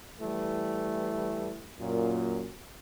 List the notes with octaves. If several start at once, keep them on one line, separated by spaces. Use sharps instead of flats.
E3 G3 A3
F#2 A#2